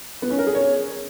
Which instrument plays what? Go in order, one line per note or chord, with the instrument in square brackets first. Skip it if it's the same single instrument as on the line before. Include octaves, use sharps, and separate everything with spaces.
[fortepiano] B3
C#4
A#4
G#4
C#5